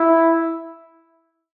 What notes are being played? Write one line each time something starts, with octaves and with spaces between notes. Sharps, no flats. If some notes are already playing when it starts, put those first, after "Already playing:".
Already playing: E4